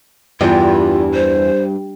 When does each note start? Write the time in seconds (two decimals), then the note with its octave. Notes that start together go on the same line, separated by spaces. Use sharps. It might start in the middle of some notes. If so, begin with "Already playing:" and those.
0.41 E2 G2 E3 F4
1.14 C5